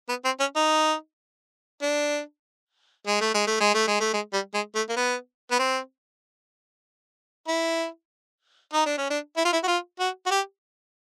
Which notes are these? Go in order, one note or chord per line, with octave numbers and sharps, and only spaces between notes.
B3
C4
C#4
D#4
D4
G#3
A3
G#3
A3
G#3
A3
G#3
A3
G#3
G3
G#3
A3
A#3
B3
B3
C4
E4
D#4
D4
C#4
D4
E4
F4
E4
F#4
F4
F#4
F#4
G4